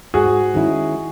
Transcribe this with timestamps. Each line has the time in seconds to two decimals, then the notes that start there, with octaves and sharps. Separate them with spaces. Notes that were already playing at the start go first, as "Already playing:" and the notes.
0.14 G#2 F#4 G#4
0.54 D#3 G#3 C#4 E4